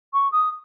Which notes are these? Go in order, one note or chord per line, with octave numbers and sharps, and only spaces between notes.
C#6
D#6